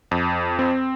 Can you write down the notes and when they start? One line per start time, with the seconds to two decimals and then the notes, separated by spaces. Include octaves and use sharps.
0.11 F2
0.59 C4